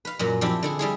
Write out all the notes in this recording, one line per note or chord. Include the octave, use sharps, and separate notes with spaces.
B4 F5
F#2 A#2 F#3
F3 C4 D4 E4 G4
D3 E4 G#4
G3 E4 G#4